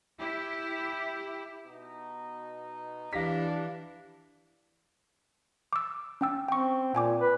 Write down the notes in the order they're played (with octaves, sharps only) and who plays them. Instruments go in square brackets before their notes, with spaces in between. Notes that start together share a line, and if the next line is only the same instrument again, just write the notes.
[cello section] E4 G4
[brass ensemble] B2 D#4
[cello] E3 [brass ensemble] D4 [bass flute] G4 [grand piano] F5 A#6 B6
[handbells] D6 E6
C#4 G5 E6
[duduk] C4 [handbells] G5 C#6
[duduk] A#2 [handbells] G5 G#5 D6
[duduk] B4